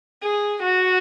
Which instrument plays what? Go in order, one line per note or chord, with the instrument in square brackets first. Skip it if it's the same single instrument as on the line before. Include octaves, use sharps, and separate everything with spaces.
[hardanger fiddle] G#4
F#4